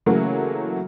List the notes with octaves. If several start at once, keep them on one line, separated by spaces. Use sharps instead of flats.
C#3 E3 F#3 A3 A#3 F#4